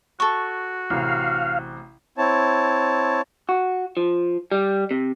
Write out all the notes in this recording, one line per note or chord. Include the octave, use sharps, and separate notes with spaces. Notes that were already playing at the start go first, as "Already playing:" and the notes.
F#4 A4 C#6
A1 C3 F5
C4 E4 C#5 A5
F#4
F3
G3
C3